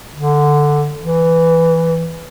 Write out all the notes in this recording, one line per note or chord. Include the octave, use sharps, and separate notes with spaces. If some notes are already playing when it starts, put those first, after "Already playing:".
D3
E3